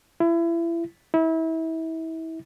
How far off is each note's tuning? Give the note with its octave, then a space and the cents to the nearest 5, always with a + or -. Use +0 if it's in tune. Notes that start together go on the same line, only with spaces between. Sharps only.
E4 +30
E4 -30